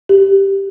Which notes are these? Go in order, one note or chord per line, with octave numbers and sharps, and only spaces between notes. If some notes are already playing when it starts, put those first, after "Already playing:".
G4